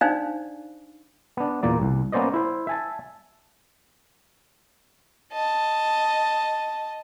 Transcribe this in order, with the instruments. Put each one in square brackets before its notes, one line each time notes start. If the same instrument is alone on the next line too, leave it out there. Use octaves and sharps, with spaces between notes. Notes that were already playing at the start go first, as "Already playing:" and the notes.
[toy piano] D4 D#4 C5 D5 F5 G#5
[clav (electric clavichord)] B3 D4
E2 A#2 A#3 D5
C2
A#3 B3 C#4 C5 D5 D#5
E4 C5
E5 G#5 A5
[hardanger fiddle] D#5 A5